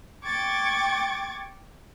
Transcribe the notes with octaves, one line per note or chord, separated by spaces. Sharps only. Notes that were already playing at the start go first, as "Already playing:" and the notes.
G5 C#6 D6 G#6 A6